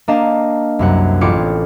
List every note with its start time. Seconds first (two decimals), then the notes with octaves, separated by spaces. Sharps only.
0.08 A#3 D4 D#5 F5 A5
0.79 C2 F#2 F#5
1.21 A1 C4 F4 G#4 D6 C#7